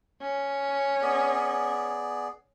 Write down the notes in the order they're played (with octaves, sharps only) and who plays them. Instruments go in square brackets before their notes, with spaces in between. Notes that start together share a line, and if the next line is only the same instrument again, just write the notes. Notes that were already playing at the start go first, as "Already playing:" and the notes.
[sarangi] C#4
[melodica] B3 G#4 D5